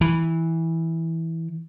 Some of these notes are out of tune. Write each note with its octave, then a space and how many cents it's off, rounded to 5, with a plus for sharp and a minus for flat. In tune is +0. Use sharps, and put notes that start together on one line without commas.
E3 -10